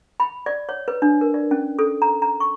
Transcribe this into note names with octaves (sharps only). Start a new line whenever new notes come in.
B5
D5
C#5
B4
D4
A#4
D5
C#4
A4
A#5
A#5
C#6